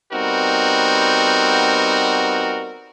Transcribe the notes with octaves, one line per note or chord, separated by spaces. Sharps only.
G3 B3 C4 D#4 F#4 A#4